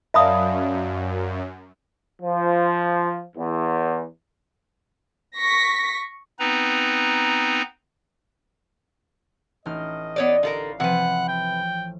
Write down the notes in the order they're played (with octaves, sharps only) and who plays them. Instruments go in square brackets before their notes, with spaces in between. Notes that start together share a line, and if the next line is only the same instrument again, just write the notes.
[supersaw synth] F#2 [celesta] D5 F5 A5 [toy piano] E5 B5 D#6
[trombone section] F3
E2
[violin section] C#6 A#6 B6
[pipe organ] B3 C4 D#4 B4 A#5
[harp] A1 D#4 F6 [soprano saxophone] D#5
[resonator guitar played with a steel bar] B3 C#5 D5
[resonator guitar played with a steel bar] D3 A4 A#4 [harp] F5
[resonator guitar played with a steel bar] C3 B4 [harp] E3 F3 [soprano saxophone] F#5
[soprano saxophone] G5